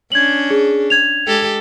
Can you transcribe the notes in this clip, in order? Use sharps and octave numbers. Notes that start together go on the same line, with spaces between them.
C#4 D4 G#6 F#7
G#4
G#6 F7
G#3 G4 A4